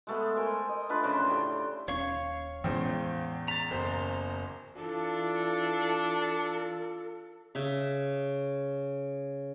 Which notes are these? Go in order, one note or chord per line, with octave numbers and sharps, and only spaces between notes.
G#3 A3 B3
A#4 C5 G#5
D#5
A3 D4 F4 B4
C#3 F3 C5 D5
A2 G4 C6
D#1 C#4 C#5 F5 C#6
E2 A2 E3 G#3 C#4 C5 G5
A#5 A6 B6
F#1 C5
E3 D4 F4 A4
C#3 E5